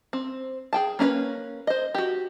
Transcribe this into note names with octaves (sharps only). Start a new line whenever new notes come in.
C4
G#4 G5 A5
A#3 C#4 E4 B4 C#5
C5 D#5
F#4 G4